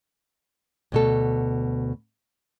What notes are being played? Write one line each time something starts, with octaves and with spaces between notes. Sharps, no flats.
D2 B2 A4